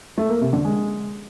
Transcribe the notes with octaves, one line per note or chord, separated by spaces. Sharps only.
A3
A#3
C3
D3
G#3